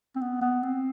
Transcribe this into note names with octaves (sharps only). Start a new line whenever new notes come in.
C4
B3
B3
C4